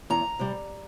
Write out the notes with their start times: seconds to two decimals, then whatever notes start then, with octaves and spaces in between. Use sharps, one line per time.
0.10 E2 A#5
0.39 C3 G3